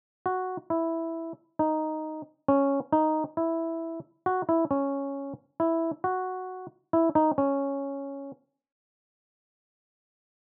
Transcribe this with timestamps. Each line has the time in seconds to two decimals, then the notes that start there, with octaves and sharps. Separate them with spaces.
0.26 F#4
0.70 E4
1.59 D#4
2.48 C#4
2.92 D#4
3.37 E4
4.26 F#4
4.49 E4
4.71 C#4
5.60 E4
6.04 F#4
6.93 E4
7.15 D#4
7.38 C#4